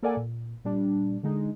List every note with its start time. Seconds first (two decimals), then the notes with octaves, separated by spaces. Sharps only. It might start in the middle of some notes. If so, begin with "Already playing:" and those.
0.03 A#3 A4 A#4 D5 F#5 G#5
0.17 A#2
0.65 A#2 G3 D4
1.23 D3 G#3 D#4